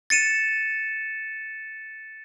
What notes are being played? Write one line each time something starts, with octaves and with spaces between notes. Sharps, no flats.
A6 C#7 D#7 E7